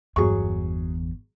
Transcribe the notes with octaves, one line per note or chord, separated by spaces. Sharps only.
G1 E2 F#3 G#4 C#6